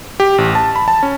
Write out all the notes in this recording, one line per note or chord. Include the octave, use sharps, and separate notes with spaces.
G4
A1
A5
B5
A5
C#4